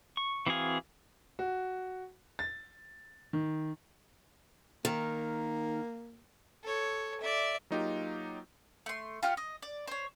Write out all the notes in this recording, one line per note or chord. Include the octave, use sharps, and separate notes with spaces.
C#6
E3 C4 F#4 G#4 F5
F#4
A6
D#3
D#3 A#3
A4 C#5
D5 E5
F#3 A#3 D#4 F4 G4
A3 C6
F4 G4 F#5 F6
D#5
D5
C5 C#5